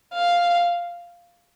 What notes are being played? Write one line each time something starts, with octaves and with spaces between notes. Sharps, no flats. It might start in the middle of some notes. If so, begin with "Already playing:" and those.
F5